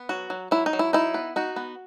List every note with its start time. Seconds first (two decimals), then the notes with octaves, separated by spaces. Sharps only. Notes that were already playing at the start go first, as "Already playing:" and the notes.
Already playing: B3
0.09 F#3 F#4
0.30 F#3
0.51 F#3 E4
0.66 D#4
0.73 F#3
0.79 E4
0.93 D#4 E4
1.14 B3
1.36 D#4 F#4
1.56 B3